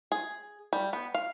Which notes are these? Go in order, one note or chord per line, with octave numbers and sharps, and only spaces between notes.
G#4
G3
B3
F5